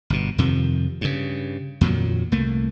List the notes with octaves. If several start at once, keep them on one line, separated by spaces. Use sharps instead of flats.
G1 B2
F2 C3 D#3 F3
G2 C#3
F2 A#2 D#3 F#3
C2 A3 A#3